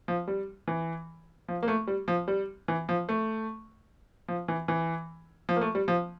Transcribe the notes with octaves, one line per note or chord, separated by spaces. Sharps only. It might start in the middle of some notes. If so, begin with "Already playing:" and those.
F3
G3
E3
F3
A#3
A3
G3
F3
G3
E3
F3
A3
F3
E3
E3
F3
A#3
A3
G3
F3